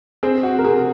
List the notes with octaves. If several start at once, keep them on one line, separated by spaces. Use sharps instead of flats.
C4 G#4 C5
F#4
A#4
C3 G#4